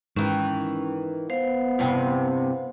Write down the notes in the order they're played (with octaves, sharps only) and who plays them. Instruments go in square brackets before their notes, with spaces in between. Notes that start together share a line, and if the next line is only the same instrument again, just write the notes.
[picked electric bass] G#2 [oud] D#3 E3 [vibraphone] C#4
[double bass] B3 [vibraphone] C5 F5
[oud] E2 G2 C3